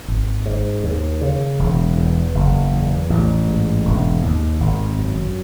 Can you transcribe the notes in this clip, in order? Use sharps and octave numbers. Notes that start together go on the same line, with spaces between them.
G#1
G#2
D#2
C#3
E1
E2
F#1
E2
A1
G#2
E1
D#2
G#1
F#2